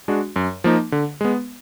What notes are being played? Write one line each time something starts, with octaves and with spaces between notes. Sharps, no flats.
G#3 D4 F#4
F#2
F3 A#3 D#4
D3
G#3 B3